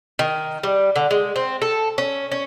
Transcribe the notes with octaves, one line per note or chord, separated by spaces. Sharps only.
D#3
G3
D3
G#3
C4
A4
C#4
C#4